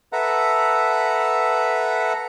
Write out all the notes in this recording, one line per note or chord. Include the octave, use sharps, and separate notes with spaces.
A4 B4 E5 F#5 A#5